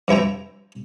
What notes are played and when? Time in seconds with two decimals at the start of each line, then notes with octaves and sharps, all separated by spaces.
0.08 G2 F3 E4 G5 A#5